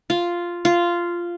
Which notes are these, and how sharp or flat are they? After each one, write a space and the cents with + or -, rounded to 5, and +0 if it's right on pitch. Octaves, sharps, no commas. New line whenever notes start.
F4 -5
F4 -10